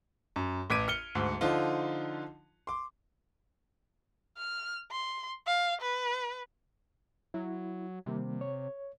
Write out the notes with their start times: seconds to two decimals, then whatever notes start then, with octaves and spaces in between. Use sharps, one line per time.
0.36 F#2
0.70 A1 D6 G#6 B6 D7 D#7
0.88 F6 C#7 G7
1.15 D2 G#2
1.41 D3 F3 D#4 F4
2.67 C6 D6
4.37 F6
4.91 C6
5.47 F5
5.81 B4
7.34 F#3 E4
8.06 C3 D#3 G3 A#3
8.41 C#5